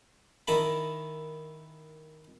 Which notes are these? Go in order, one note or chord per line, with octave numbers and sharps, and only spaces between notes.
D#3 E4 A#4 A5 B5